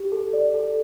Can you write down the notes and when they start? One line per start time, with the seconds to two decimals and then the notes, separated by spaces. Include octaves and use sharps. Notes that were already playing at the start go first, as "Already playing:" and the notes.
Already playing: G4
0.12 A4
0.33 D5
0.54 A4